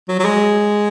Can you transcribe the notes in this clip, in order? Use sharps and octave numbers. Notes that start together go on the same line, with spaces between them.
F#3
F#3
G#3